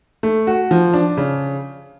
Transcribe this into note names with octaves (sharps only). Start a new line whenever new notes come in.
A3
F#4
F3
D4
C#3